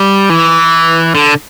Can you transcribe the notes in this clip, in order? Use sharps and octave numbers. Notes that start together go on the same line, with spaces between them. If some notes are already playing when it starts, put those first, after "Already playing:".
Already playing: G3
E3
D3